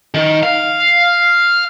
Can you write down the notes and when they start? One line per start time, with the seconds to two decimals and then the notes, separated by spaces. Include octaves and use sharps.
0.14 D#3
0.43 F5